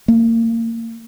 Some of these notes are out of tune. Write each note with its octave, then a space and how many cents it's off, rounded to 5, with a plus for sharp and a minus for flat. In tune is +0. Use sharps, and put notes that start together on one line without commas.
A#3 -30